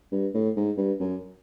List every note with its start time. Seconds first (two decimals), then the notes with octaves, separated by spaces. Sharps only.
0.12 G2
0.34 A2
0.57 G#2
0.77 G2
1.00 F#2